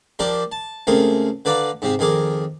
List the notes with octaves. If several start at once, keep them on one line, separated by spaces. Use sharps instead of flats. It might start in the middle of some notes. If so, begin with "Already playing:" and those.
F3 D4 G4 A#4 D5
A5
C#2 A3 C4 G#4 A#4
D3 B4 D5 F5 A#5 B5
G#2 C3 C4
F2 D#3 G#4 A#4 D6